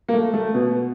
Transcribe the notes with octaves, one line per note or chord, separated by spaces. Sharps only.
A#3
A3
A3
B2 B3